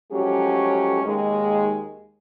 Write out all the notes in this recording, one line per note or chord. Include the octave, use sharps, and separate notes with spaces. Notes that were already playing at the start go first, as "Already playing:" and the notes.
F3 F#3 G#3 A3 C#4 G4
D#2 G#3